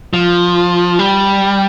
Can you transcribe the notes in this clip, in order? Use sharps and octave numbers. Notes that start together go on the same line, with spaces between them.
F3
G3